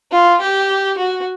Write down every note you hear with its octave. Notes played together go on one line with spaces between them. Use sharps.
F4
G4
F#4